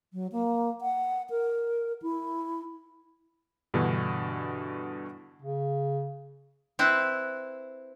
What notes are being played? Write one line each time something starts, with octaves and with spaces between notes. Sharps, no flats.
F#3
A#3
F#5
A#4
E4
G2 B2 D3 E3 F#4
C#3
C4 E4 B4